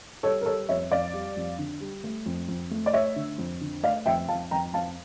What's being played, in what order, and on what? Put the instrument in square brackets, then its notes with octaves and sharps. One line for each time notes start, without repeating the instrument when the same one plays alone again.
[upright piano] G3 A4 C#5
A#4
G3 A4 C#5
F2 C#5 E5
F2 D5 F5
G3
F2
D3
G3
A3
F2
F2
A3
D5
A3 C#5 E5
D3
F2
D3
A3 D5 F5
F2 E5 G5
F2 F5 A5
F2 G5 A#5
F2 F5 A5